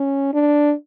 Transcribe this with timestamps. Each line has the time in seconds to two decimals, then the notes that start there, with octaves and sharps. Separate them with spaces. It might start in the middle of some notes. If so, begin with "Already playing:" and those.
Already playing: C#4
0.33 D4